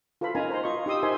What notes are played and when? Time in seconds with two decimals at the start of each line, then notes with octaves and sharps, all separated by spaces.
0.21 F4 A4 B4 F5 B5
0.35 C#4 D#4 A#4 G#5 A#5
0.50 C5 A#5 C6
0.64 F4 D#5 C#6
0.86 D#4 G4 C6 D#6 E6
1.03 D#4 A#4 C5 E5 G#5 C6